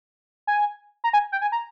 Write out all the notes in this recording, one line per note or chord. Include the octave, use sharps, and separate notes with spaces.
G#5
A#5
G#5
G5
G#5
A#5